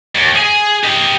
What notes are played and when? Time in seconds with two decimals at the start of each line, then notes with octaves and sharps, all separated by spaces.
0.15 D#2
0.35 G#4 G#5
0.83 G4 D#5